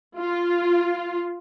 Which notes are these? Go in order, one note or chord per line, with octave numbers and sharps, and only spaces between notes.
F4